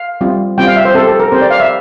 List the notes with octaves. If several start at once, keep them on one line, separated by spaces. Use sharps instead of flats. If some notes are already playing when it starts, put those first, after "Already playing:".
Already playing: F5
G3 C4 F4
G3 C4 F4 G5
F5
E5
C5
C4 G4 A4
A4
A#4
C4 G4 C5
D5
F5
E5